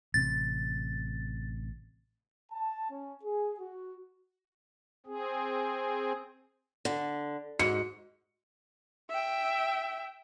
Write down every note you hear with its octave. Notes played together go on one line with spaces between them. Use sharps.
A1 C3 C4 A6
A5
C#4
G#4
F#4
C4 G#4
D3
G#2 F#4 C#7
E5 G5